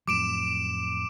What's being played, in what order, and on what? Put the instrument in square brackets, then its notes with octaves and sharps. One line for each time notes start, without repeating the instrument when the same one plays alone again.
[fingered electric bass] F2 A2 F#3 [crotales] D6 D7 E7